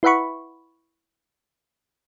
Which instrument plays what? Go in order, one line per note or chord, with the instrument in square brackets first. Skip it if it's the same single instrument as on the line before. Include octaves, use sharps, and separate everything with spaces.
[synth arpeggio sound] E4 B4 E5 F#5 B5 C#6